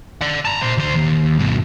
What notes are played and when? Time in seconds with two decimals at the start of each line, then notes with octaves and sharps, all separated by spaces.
0.21 D5 F#5
0.45 A5 A#5
0.62 A#2 C5
0.78 D2 C5
0.96 D#2
1.39 G2 B2